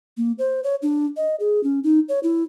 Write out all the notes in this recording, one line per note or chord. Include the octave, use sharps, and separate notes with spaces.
A#3
C5
C#5
D4
D#5
G#4
C#4
D#4
C#5
E4